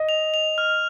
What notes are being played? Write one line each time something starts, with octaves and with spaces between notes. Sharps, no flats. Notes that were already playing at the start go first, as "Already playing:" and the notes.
Already playing: D#5
F7
F7
F6